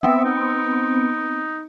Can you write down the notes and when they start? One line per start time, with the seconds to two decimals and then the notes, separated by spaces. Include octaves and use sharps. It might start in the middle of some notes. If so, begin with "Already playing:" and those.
0.03 B3 C4 E5
0.25 D#4